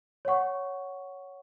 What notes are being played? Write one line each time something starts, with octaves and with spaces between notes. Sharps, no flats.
C#5 F#5 C#6